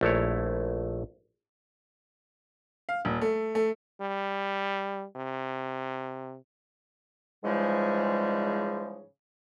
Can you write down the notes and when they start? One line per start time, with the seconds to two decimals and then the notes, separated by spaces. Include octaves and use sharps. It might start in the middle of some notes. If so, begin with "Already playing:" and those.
0.01 A#1 A3 E4 C#5
2.89 F5
3.05 D#1
3.21 A3
3.55 A3
4.01 G3
5.16 C3
7.44 G#2 C#3 E3 F3 G3 G#3